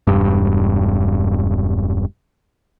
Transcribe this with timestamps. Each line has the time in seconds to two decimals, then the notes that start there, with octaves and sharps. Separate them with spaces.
0.07 E1 G2